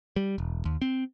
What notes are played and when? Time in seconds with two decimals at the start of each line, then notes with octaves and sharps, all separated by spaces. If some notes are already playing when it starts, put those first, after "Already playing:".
0.16 G3
0.38 E1
0.65 D#2
0.82 C4